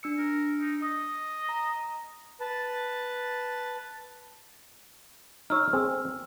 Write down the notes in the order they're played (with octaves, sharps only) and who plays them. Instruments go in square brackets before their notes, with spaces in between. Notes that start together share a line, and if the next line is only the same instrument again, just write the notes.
[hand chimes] D4 E6 C#7
[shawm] A#4
D#4
[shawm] D#5 [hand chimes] D#6
[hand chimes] A#5
[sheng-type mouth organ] B4 A5
[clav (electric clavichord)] D#4 C#5 [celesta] E6 F6
[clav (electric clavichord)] C4 G#4